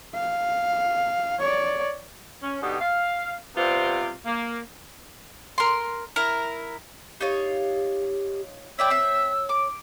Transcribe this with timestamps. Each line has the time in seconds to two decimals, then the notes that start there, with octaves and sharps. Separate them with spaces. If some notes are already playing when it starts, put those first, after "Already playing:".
0.15 F5
1.39 C#5 D5
2.42 C#4
2.62 B2 D3 D#4 G4
2.80 F5
3.56 C3 G3 B3 F4 C5
4.25 A#3
5.58 A#4 C6
6.16 E4 A#4 A#5
7.20 D#4 F4 G4 C#5
8.79 E4 C#5 D5 G5 E6
8.90 C4 E5
9.49 D6